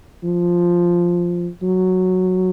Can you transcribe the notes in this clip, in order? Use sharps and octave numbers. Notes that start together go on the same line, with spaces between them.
F3
F#3